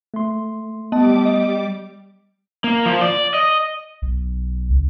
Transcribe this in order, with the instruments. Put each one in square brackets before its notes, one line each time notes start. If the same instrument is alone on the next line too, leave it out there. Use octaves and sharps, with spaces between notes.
[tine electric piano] A3 C6
[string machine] G3 D6 [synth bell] B3 [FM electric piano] D#5 A5
[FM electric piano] D#5
[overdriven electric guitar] A#3
F3
D5
D#5
[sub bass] B1
C#2